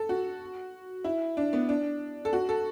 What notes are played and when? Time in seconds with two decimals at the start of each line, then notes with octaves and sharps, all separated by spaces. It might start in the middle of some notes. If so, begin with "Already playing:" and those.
Already playing: A4
0.09 F#4
1.04 E4
1.37 D4
1.53 B3
1.69 D4
2.25 A4
2.33 F#4
2.49 A4